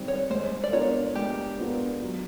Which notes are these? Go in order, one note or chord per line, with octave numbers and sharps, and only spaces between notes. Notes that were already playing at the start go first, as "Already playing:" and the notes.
Already playing: D#3 G3 C4
C#5
G#3 C5
D5
B3 D4 F4 A#4 C#5
G#3 G4
B3 D4 F4 A#4
F#3